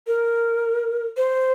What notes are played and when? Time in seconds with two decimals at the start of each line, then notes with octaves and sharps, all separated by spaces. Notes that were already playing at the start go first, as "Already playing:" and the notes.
0.07 A#4
1.17 C5